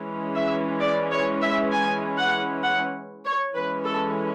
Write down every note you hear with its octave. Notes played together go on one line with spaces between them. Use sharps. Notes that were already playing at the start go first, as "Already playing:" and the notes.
Already playing: E3 G#3 C#4
E5
D5
C#5
E5
G#5
F#5
F#5
C#5
E3 G#3 C#4 B4
A4